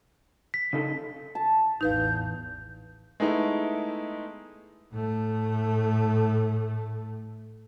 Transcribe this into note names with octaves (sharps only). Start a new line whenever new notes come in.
B6
C#3 D#4 A4
A5
A1 E2 D#4 B4 F5 G6
G#3 A3 B3 D#4 E4
A2 A3